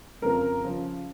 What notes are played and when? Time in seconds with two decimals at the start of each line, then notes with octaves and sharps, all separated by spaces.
0.22 F2 C#3 F3 A#4
0.64 C#3 F3